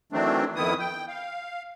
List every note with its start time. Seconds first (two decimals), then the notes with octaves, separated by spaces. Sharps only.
0.12 D#3 E3 F#3 A3 C4 D4
0.56 F2 D#3 B3 E4 D#6
0.79 G5
1.08 F5